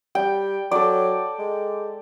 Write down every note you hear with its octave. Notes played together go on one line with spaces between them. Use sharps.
G3 G5
F#3 A4 D5
G#3